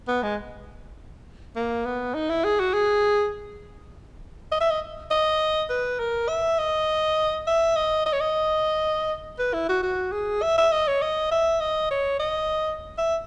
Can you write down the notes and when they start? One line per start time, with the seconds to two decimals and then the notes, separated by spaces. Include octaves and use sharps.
0.08 B3
0.23 G#3
1.56 A#3
1.86 B3
2.15 D#4
2.30 E4
2.44 G#4
2.60 F#4
2.74 G#4
4.52 D#5
4.61 E5
4.71 D#5
5.11 D#5
5.70 B4
5.99 A#4
6.28 E5
6.58 D#5
7.47 E5
7.76 D#5
8.06 D#5
8.13 C#5
8.20 D#5
9.39 B4
9.54 E4
9.69 F#4
9.83 F#4
10.12 G#4
10.42 E5
10.58 E5
10.72 D#5
10.87 C#5
11.02 D#5
11.32 E5
11.61 D#5
11.91 C#5
12.20 D#5
12.98 E5